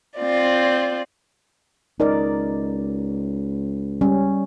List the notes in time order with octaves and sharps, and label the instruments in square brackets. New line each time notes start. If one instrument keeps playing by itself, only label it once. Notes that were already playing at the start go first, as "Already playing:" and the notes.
[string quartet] C4 F4 D5
[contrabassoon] C#2 [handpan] D#4 A#4 D5
[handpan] G3 C#4